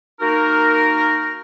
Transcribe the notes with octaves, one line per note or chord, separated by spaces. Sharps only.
A#3 D#4 F#4 A#4